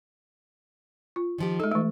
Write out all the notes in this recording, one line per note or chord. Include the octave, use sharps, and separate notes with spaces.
F4
D#3 F3 G4
G#3 D#4 A4
E3 A3